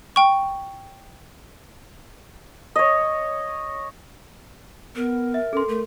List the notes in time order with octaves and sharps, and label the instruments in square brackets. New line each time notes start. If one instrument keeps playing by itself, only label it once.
[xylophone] G5 C#6
[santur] C#5 D#5
[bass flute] B3 [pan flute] A#4
[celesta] E5
[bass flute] C#4 [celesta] A4 C6
[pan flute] A3 [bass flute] A#4